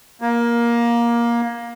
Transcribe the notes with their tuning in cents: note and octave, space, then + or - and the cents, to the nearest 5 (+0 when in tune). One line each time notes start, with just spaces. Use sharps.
A#3 +15